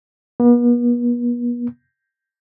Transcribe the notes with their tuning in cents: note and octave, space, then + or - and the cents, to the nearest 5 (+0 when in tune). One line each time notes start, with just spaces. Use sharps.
B3 -40